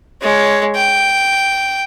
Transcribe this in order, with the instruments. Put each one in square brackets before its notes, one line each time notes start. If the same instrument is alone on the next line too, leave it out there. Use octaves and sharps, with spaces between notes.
[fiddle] G#3 C#5
G5